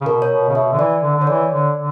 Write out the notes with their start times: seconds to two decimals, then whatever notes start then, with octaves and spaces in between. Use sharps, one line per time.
0.01 C#3
0.06 B2 A#4
0.22 C#5
0.31 B2
0.49 C#3
0.55 B2 E5
0.72 D3
0.79 E3 D5
1.03 D3
1.16 D3
1.22 C#5
1.27 E3 D5
1.51 D3
1.75 D3